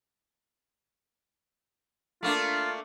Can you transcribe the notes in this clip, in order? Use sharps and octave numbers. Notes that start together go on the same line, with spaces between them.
A3 A#3 D4 F4